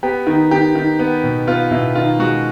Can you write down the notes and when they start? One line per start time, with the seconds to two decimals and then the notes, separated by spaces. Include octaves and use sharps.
0.03 B3 G4
0.27 D#3
0.51 D#3 G4
0.75 D#3
0.99 B3
1.24 B2
1.47 B3 F4
1.71 B2 E4
1.95 D#3 F4
2.19 G#3 F#4